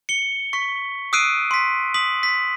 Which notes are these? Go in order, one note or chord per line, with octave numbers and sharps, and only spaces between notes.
C#7 G7
C#6 B6
D#6 E6 F#6 C7 D7 D#7
C6 B6
D#6 B6 F#7
B6